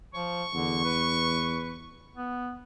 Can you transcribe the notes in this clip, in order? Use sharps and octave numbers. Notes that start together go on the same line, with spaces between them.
F3 C#6
E2 D3
B4
B3